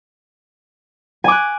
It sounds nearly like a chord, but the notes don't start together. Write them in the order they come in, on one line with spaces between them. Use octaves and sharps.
G#5 D6 F#6